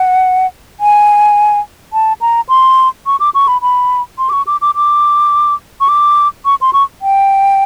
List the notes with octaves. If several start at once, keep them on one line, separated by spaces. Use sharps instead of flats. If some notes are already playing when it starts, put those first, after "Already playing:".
Already playing: F#5
G#5
A5
A#5
C6
C#6
D6
C#6
B5
B5
C6
D6
C#6
D6
D6
D6
C#6
D6
C#6
C6
C#6
G5